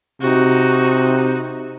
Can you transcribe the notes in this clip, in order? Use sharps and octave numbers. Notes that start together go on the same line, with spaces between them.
C3 D#4 F#4